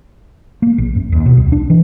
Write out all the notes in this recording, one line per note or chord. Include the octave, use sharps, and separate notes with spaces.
A#3
A#1
F#2
D#2
B2
C2
D4
E3